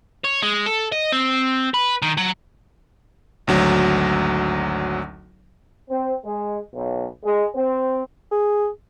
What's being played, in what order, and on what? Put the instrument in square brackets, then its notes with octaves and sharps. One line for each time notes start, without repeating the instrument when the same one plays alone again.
[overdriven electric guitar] C#5
G#3
A4
D#5
C4
B4
D#3
F#3
[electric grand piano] G#1 D2 F#3
[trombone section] C4
G#3
B1
G#3
C4
[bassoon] G#4